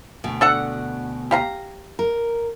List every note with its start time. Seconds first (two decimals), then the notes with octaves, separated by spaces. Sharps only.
0.24 D2 B2
0.41 D4 A4 F#5
1.31 G4 F5 A#5
1.99 A#4